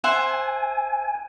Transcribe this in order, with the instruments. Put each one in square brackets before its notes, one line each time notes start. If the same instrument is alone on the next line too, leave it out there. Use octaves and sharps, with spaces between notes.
[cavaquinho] C5 E5 F#5 [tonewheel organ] G#5